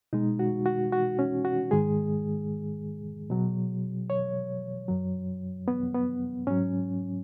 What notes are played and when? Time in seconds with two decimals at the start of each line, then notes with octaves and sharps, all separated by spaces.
0.13 B2 G#3 D#4
0.39 F#4
0.66 F#4
0.93 F#4
1.19 C#4
1.45 F#4
1.71 G#2 D#3 G#3 G#4
3.30 B2 F#3
4.10 C#5
4.88 F#2 F#3
5.68 B3
5.94 B3
6.47 G#2 F#3 C#4